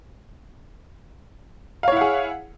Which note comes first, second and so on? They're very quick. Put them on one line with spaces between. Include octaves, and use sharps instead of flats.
F5 C#5 E4 F#5 G#4